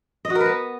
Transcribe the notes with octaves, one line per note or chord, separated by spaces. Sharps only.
D#5
F#4
A#4
B4
B3